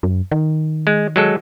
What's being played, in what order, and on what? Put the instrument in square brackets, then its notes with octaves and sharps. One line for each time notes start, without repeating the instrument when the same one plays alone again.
[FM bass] F#2
D#3
[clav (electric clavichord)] G#3
F#3 G#3 A4